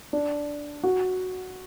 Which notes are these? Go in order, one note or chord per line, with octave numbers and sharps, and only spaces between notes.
D4
F#4